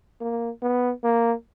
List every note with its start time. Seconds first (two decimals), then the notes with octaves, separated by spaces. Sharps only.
0.21 A#3
0.62 B3
1.04 A#3